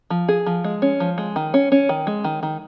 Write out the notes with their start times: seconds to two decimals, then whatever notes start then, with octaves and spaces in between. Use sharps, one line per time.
0.10 F3
0.28 G#4
0.46 F3
0.64 G#3
0.82 C#4
1.00 F3
1.18 G#3
1.36 D#3
1.54 C#4
1.72 C#4
1.89 D#3
2.07 G#3
2.24 D#3
2.43 D#3